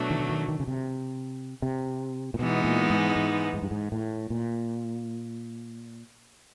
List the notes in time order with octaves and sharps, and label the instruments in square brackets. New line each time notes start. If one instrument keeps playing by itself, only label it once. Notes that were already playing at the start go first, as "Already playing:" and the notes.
Already playing: [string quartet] B2 F#3 A3 D4
[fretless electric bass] D#3
D3
D#3
D#3
C#3
C3
C3
A#2
[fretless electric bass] B2 [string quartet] E3 G#3 B3 D#4
[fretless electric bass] A#2
G#2
G#2
G#2
G2
G#2
A2
A#2